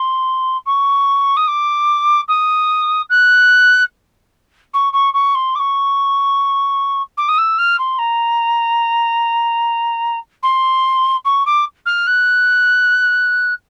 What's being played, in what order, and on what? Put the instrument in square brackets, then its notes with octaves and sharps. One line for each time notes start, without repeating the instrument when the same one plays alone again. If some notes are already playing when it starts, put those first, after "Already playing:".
Already playing: [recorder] C6
C#6
D#6
D6
D#6
F#6
C#6
C#6
C#6
C6
D6
C#6
D6
D#6
E6
F6
C6
A#5
C6
C#6
D6
F6
F#6